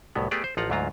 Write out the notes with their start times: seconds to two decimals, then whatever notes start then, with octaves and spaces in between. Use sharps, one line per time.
0.16 C2 A2 F#3 B3
0.31 A3 B3 G4 G#4 D5
0.44 C5
0.57 A1 F3 F4 F#5 A#5
0.70 D2 G#2 F#3 F4 A#5